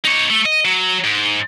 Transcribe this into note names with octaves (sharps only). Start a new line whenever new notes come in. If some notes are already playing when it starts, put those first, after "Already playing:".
D#4 C#5
A3
D#5
F#3
G#2